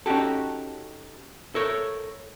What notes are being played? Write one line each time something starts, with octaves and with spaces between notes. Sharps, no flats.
C#4 D#4 F#4 G4 A4
A4 A#4 C#5